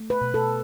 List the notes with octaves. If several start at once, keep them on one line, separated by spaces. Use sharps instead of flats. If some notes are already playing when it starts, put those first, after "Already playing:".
Already playing: A3
B4
B2
A4